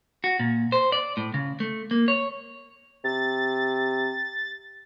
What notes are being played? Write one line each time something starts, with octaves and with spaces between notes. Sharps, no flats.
F#4
A#2
C5
D5
A2
C#3
A3
A#3
C#5
C3 A6